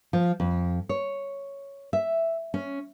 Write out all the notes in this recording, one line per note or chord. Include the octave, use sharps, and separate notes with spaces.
F3
F2
C#5
E5
C#4